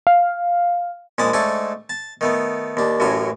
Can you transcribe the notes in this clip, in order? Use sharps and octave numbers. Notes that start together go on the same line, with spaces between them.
F5
A#1 G#3 A5 B5 D#6
G#2 A3 D4 A4 G#5 C#6
A5
D#3 A3 B3
D#2 D4
A1 F#2 A2 F#3 G#5